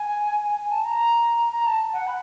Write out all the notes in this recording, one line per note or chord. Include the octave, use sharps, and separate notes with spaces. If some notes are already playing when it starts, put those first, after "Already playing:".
Already playing: G#5
G#5
A5
A#5
A#5
A5
F#5
B5